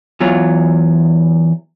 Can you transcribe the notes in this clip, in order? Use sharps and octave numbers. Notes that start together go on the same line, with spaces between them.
E2 E3 F#3 F4